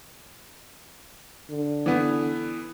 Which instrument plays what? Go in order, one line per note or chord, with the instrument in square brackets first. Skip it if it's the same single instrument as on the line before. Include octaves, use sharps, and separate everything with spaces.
[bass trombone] D3
[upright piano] E3 B3